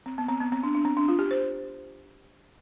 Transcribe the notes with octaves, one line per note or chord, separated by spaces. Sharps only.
C4
B3
C4
B3
C4
D4
D4
C4
D4
F4
G4
C5